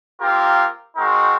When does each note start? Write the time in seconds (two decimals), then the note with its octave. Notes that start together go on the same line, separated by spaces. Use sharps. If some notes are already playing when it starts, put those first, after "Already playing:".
0.21 A#3 C4 F4 G4 A#4
0.97 G#3 C4 D#4 F#4 A#4